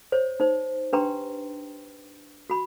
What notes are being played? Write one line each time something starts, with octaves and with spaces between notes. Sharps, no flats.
C5 C#5
D#4 C5
D4 G4 B4 G5 A#5 C6
F#4 B5